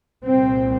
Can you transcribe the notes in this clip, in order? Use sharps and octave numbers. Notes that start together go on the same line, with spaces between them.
C2 A#2 C4